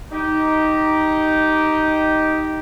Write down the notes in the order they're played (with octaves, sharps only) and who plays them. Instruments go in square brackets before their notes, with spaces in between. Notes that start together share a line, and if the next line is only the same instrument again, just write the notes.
[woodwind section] D#4 G4